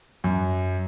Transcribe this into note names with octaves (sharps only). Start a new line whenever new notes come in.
F#2